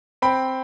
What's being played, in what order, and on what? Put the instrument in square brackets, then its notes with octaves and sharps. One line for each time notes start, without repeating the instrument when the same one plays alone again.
[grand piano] C4 G5 B5